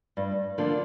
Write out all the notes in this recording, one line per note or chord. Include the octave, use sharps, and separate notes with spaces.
G2
D3 F3 A#3 D4